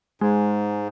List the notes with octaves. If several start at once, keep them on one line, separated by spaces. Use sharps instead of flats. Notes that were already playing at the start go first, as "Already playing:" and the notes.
G#2 G#3